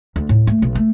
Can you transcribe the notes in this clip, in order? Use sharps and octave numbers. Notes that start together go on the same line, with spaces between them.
D2
A2
A3
B1
A3